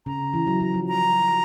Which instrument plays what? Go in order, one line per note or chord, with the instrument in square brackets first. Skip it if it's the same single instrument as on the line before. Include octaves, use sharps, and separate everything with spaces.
[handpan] C#3 [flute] A#5
[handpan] E3
F#3
F#3
F3
[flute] A#5